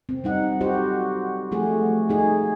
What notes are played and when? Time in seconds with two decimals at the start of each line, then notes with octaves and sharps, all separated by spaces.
0.09 C4
0.24 G3 D#4 F#5
0.61 F#4 G4 C5
1.52 F3 A3 F#4 G#4
2.09 D#4 G#4